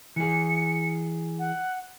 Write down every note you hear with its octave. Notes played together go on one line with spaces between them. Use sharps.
E3 G#4 C#7
F#5